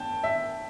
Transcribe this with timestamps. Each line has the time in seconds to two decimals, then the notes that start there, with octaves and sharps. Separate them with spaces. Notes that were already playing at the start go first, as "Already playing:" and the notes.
Already playing: G5 A5
0.24 E5